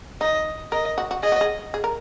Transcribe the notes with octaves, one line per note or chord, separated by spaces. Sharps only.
D#4 D#5
A#4 D#5
F#4
F#4
G#4 D#5
F#4
G#4
G#4
A#4